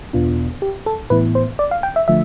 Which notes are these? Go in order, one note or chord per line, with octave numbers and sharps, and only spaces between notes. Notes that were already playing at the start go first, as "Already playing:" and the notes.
E2 B2 B3 D4 F4
G4
A4
A2 E3 B3 E4 B4
C5
D5
F5
G5
E5
D3 F3 A3 E5